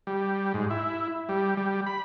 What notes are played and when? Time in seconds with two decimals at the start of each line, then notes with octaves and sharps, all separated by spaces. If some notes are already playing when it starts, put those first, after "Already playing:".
0.07 G3
0.54 G#2
0.70 E4
1.29 G3
1.57 G3
1.86 B5